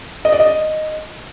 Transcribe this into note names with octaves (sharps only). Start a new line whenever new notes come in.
D#5
D5
D#5